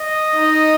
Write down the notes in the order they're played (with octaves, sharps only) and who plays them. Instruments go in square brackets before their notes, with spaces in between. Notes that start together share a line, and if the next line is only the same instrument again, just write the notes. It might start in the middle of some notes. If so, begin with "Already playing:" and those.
Already playing: [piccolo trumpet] D#5
[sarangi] D#4